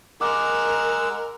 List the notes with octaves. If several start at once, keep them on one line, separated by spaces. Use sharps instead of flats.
G#3 A#4 F#5 D6 E6